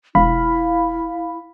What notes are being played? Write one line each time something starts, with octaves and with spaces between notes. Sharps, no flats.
E1 E4 F5 B5